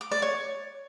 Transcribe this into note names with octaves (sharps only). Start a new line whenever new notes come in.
D6
D5
C#5